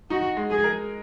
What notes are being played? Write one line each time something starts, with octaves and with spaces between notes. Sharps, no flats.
D#4 F#4
G#3
G#4
A#4